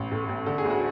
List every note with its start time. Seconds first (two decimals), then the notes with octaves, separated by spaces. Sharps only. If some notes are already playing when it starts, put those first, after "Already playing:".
Already playing: A1
0.11 A2
0.29 A1
0.46 D3 A4
0.58 G#4
0.65 D2
0.70 F#4